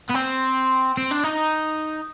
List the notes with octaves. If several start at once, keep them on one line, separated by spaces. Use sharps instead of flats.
B3
C4
C4
D4
D#4